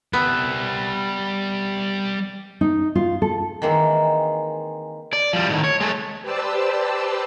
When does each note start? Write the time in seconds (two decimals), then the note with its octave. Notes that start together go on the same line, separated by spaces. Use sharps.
0.13 G3 B3 E5
2.61 D#4
2.95 F4
3.22 A4
3.62 D#3 E3 G#3 A#3 C4
5.13 D5
5.33 F3 G3
5.49 A2 D#3
5.64 C#5
5.81 G#3 A3
6.22 G4 B4 C5 D5 A5 E6